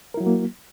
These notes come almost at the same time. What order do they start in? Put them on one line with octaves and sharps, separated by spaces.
A#4 E4 F#3 F#4 A#3